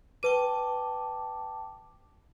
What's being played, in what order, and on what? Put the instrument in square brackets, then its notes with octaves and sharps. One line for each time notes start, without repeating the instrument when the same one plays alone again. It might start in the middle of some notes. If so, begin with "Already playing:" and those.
[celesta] B4 D#7 [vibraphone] G5 A5 D6